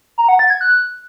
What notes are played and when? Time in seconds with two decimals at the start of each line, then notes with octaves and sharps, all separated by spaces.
0.18 A#5
0.28 F#5
0.39 A6
0.50 G#6
0.61 F#6